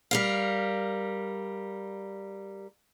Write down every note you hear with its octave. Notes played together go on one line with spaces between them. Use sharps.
G3 A#4 F5